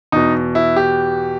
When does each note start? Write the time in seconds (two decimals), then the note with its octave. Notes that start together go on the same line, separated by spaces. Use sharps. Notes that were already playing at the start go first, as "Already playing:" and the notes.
0.12 E2 B2 D#4
0.55 E4
0.76 G4